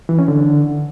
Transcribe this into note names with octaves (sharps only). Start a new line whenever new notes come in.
E3
C#4
D3